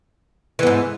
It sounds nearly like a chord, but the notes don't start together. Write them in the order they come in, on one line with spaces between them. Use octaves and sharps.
E3 B3 G#2